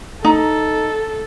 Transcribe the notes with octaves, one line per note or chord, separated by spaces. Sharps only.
D#4 A4